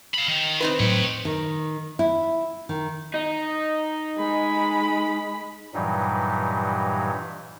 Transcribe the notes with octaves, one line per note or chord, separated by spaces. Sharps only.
F5 B5
D#3
C4 D#4 B4
A2 F#3 C#5 G5
D#3
E4
D#3
D#4
G#3 B5
G2 A#2 E3 F#3 G3 D#4